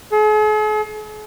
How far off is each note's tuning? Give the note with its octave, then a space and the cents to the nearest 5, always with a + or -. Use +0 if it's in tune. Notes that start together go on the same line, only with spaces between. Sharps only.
G#4 +45